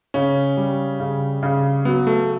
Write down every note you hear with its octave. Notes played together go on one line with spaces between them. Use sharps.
C#3 C#4
G3
C#3
C#3
F#3 B3
A3